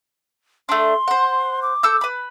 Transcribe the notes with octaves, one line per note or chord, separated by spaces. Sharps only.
A3 D4 C6
C5 F#5
D6
A4 E6 G6
B4 B5